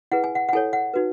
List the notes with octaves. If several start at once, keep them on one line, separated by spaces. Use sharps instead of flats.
E4 G#4 B4 F#5
G#5
F#5
F#5
E4 A4 C#5 G#5
F#5
D#4 F#4 B4